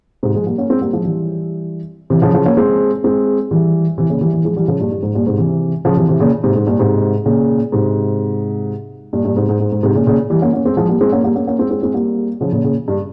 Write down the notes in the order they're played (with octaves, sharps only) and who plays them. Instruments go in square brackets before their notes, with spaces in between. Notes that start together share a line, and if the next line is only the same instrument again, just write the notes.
[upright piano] G#2 C3
F3 G#3
G3 A#3
A#3 C#4
G#3 C4
G3 A#3
F3 G#3
E3 G3
C3 E3
C#3 F3
C#3 F3
A#3 C#4
G#3 C4
G#3 C4
E3 G3
C3 E3
A#2 C#3
E3 G3
E3 G3
F3 G#3
E3 G3
C#3 F3
G2 A#2
G2
G#2
G2 A#2
G#2 C3
C3 E3
C#3 F3
C3 E3
C3 E3
A#2 C#3
G#2 C3
G#2
G2 A#2
G#2 C3
A#2 C#3
G#2 C3
G2 A#2
G2 A#2
G#2 C3
G#2
G#2
G#2
G#2 C3
A#2 C#3
A#2 C#3
E3 G3
A#3 C#4
A#3 C#4
G#3 C4
F3 G#3
G3 A#3
G#3 C4
A#3 C#4
G3 A#3
A#3 C#4
A#3 C#4
G#3 C4
G#3 C4
G#3 C4
G3 A#3
C#3 F3
A#2 C#3
A#2 C#3
G2